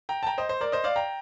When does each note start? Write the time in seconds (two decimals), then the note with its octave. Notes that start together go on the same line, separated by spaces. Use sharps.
0.09 G5 A#5
0.23 A5
0.27 G5 A#5
0.38 C5 D#5
0.49 C5
0.61 A#4 D5
0.72 C5 D#5
0.84 D5 F5
0.96 G5 A#5